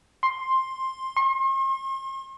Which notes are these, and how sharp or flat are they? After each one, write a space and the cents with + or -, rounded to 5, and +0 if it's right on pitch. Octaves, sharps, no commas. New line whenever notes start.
C6 +10
C6 +45